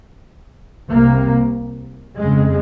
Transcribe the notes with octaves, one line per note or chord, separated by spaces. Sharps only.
C2 C3 A#3
F2 C#3 G#3